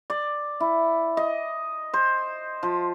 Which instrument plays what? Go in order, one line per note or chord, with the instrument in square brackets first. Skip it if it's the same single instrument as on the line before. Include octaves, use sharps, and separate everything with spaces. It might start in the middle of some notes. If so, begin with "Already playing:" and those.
[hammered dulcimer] D5
E4
D#5
C5
F3